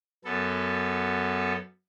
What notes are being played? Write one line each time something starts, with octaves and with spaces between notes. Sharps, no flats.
F#2 B3 A4